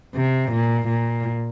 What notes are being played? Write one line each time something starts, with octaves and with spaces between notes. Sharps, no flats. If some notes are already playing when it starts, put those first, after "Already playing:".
C3
A#2
A#2